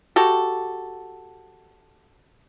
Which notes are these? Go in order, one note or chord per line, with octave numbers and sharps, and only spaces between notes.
F#4 G4 A4